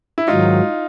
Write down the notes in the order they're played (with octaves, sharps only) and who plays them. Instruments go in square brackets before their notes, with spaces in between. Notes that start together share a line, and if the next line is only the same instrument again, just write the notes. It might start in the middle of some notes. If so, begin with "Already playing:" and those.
[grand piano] E4
[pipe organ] G#2 D#3 F#3 [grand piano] D#4 F4